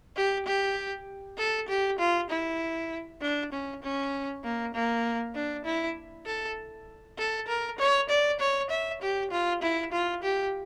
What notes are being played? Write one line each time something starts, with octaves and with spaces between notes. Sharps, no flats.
G4
G4
A4
G4
F4
E4
D4
C#4
C#4
A#3
A#3
D4
E4
A4
A4
A#4
C#5
D5
C#5
E5
G4
F4
E4
F4
G4